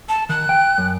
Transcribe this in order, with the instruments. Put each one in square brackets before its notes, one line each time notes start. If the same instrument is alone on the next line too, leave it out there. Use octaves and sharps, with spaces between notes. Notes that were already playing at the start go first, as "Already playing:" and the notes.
[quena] A5
[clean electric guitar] D#3 [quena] F#6
[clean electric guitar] G5
F#2